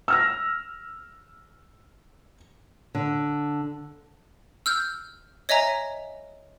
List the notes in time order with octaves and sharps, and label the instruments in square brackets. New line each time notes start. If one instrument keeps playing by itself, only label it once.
[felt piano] E6 F6 A#6
[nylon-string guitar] D3
[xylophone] E6 F6 G6
C#5 D#5 E5 G#5 A#5